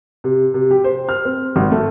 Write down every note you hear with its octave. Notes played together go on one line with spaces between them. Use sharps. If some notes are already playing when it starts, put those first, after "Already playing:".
C3
C3
G4
C5
F6
C4
G#1
A3